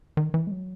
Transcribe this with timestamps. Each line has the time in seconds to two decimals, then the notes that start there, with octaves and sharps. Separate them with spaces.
0.17 D#3
0.34 E3
0.47 G#3
0.51 F#3